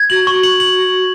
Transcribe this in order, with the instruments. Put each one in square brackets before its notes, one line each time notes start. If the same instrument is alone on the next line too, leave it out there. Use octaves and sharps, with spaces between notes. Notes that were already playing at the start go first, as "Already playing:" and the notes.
Already playing: [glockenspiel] G#6
[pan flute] F#4 [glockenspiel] F#7
[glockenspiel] C#6
F#7
F#7